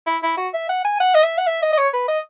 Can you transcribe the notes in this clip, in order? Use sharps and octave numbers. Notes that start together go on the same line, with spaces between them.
E4
E4
F#4
E5
F#5
G#5
F#5
D#5
E5
F#5
E5
D#5
D#5
C#5
B4
D#5